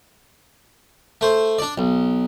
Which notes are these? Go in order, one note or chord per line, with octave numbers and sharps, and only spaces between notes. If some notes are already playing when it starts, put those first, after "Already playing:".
A3 C5
D4 D5
B1